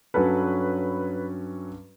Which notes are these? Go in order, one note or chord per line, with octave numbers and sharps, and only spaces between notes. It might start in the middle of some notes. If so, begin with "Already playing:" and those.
G2 F#3 C#4 F#4 A4 B4